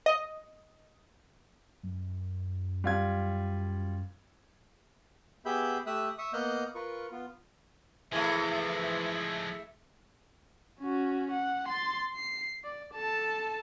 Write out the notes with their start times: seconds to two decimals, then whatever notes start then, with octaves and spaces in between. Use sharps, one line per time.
0.06 D#5
1.83 F#2
2.84 G3 F4 G#6
5.45 B3 G4 G#4 E5 B5 G6
5.87 A3 G4 E5 D#6 E6 F#6
6.18 E5 C#6 D#6
6.33 A#3 B3 D#5 F#5 F6 G6
6.75 F4 A#4 B4 C#6
7.11 B3 F4
8.12 E3 F3 G#3 A3 E4 G#4 E5
10.80 C#4 F#4
11.31 F#5
11.68 C6 A6
12.16 C7
12.64 D5
12.94 A4 A5